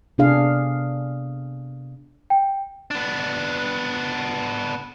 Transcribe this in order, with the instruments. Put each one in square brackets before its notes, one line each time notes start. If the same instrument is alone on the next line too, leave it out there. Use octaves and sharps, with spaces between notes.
[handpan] C3 B3 D4 G#4 F5
[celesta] G5
[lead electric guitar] B3 D4